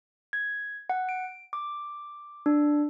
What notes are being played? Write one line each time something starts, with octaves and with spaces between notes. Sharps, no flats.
G#6
F#5
D7
D6
D4